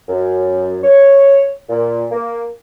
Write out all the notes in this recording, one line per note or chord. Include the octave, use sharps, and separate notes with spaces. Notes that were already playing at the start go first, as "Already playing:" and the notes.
F#2
C#5
A#2
A#3